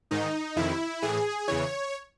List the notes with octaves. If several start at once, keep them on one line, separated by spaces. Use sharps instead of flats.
G#2 D#3 D#4
F2 C3 D#3 E4
A2 E3 G#4
E2 C#3 E3 C#5